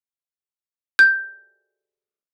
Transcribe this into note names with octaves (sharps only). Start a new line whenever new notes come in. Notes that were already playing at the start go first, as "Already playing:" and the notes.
G6